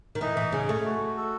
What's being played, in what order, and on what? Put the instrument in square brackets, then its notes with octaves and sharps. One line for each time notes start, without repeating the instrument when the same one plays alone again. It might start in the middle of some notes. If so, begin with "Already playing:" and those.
[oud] D#3
[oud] E3 [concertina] D#4
[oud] E3
[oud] C#3 [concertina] G#4
[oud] A3
[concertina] F#4
A4